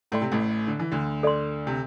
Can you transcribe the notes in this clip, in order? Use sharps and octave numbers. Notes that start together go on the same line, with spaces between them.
A2 E4 A4 D5 G5 C6
C3
A1 A2
D3
E3
D2 D3
A4 D5 C6
C3